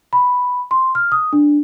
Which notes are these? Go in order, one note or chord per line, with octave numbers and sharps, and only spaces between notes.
B5
C6
F6
D#6
D4